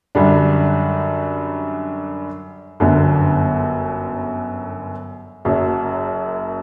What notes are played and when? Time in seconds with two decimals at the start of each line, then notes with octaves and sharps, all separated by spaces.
0.15 F#2 D3 G3 D4
2.80 G1 F#2 D3
5.45 F#1 F#2 F#3